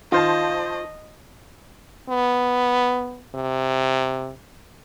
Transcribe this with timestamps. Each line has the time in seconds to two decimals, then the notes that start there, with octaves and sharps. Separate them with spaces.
0.12 D#3 F4 C5 D#5 A5
2.09 B3
3.35 C3